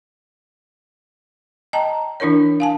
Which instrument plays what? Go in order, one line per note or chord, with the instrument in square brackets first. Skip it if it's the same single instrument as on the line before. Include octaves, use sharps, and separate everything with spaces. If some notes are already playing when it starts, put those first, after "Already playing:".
[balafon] D#5 G5 A5 A#5
E3 D4 E4 A#4 C#5
F5 G#5 A5